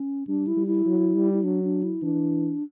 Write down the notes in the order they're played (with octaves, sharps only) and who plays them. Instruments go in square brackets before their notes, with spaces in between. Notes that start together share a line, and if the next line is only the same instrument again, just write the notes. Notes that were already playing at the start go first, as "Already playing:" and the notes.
Already playing: [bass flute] C#4
[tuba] G3 [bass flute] D4
[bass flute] E4
[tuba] G3
[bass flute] E4
[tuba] F#3
G3
[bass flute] E4
[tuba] F#3 [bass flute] D4
[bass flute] D4
E4
[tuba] E3 [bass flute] D4